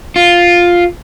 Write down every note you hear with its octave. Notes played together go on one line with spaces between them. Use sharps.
F4